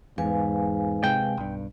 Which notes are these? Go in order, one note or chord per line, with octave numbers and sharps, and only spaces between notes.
E2 G#2 B4 F5 G#5
C3 G#3 G5
B1 G2